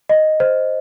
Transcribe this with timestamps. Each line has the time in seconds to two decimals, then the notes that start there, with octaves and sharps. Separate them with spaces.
0.09 D#5
0.40 C5